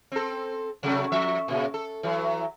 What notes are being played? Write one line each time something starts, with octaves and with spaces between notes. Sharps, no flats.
C4 A4
C3 F#3 A3
F3 E5
A#2 C#3
A4
E3 F#3